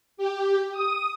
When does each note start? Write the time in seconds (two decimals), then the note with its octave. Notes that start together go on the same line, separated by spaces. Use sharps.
0.17 G4
0.72 D#6